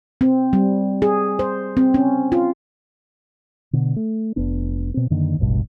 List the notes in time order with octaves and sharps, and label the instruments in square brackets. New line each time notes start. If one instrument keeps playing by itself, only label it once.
[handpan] C4
G3
G#4
C5
C4
C#4
F4
[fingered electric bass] B2 D3
A3
F1 B3 D4
B2 C4
F#2 D3 D#3 A#3
E1 A1 G2 B2